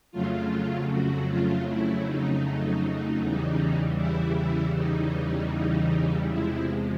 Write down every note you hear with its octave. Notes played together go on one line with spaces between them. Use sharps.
F2 C#3 F#3 A3 F4
F#4
F4
E4
D#4
E2 C#3 E3 G3
E4
D#4
E2 C3 F3 G#3 E4